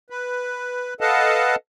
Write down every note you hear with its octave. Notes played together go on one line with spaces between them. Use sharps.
B4
A4 B4 D#5 F5 F#5 A5